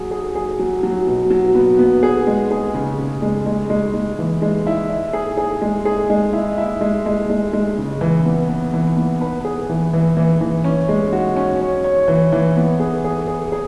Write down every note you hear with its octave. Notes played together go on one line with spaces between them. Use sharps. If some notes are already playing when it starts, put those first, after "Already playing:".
Already playing: F#3 G#4
G#4
G#4
F#3
F#3
B2
F#3
B3
B3
G#4
G#3
G#4
C#3
C#3
G#3
G#3
G#3
G#3
E3
G#3
E4
E4
G#4
G#4
G#3
G#4
G#3
E4
E4
G#3
G#3
G#3
G#3
C#3
E3
B3
B3
E3
B3
B4
G#4
E3
E3
E3
E3
C#4
G#3
F#4
C#4
C#5
C#5
E3
E3
B3
G#4
G#4
G#4
G#4